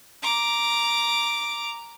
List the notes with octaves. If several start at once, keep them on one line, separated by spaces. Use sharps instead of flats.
A#5 D6